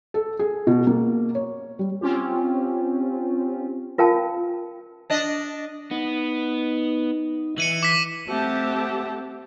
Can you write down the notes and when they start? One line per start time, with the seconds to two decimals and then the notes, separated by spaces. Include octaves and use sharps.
0.14 A4
0.39 G#4
0.67 B2
0.87 A#3
1.35 C#5
1.79 G3
2.01 C4 C#4 F4 G4
3.98 F4 A#4 F5 G5 A5
5.10 D4 D#5
5.91 B3 D#4
7.58 E3 C#7 D#7 F#7
7.83 D6 B6
8.28 A3 C4 G4 E5 F#5 A5